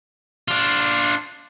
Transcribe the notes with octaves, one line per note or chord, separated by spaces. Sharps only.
D4 F4